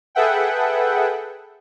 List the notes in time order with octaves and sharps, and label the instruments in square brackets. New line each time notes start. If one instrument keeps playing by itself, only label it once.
[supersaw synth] G#4 A4 B4 E5 F#5 G5